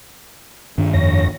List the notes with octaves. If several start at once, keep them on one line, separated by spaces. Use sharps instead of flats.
G2 D#3 D4
F2 C#5 A#6